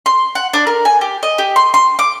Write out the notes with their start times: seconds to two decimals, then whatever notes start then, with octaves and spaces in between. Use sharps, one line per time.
0.06 C6
0.35 F#5
0.54 D4
0.67 A#4
0.85 G#5
1.01 G4
1.23 D#5
1.38 G4
1.56 C6
1.74 C6
1.99 D6